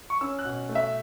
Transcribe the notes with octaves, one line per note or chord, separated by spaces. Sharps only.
C#6
C#4 E6
F#6
B2
A3
E5